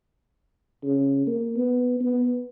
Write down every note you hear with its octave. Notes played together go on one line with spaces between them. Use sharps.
C#3
A#3
B3
B3